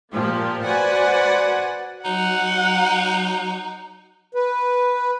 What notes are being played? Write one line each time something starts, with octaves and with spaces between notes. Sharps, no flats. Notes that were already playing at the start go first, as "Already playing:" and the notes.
A#2 F3 A#3 G4
F#4 B4 C5 D5 F#5 G#5
F#3 D#4 F#5
B4